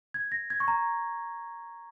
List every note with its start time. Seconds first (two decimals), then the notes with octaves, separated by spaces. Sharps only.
0.14 G#6
0.32 A#6
0.50 G#6
0.60 C#6
0.68 A#5